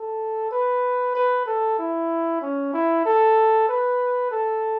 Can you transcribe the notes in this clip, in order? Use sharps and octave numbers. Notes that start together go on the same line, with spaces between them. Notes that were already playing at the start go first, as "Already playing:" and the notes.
Already playing: A4
B4
B4
A4
E4
C#4
E4
A4
B4
A4